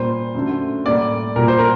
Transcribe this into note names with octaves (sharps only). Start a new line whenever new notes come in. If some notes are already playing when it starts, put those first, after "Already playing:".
Already playing: A#2 G3 A#3 C5
F#2 D3 A3
A2 G3 A#3 D5
A#2 G3 A#3 A#4
C5
A#4